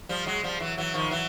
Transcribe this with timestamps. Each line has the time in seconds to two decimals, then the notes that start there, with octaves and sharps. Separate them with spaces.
0.09 F3 G3
0.26 F#3 G#3
0.43 F3 G3
0.60 E3 F#3
0.77 E3 F#3
0.94 D#3 F3
1.11 E3 F#3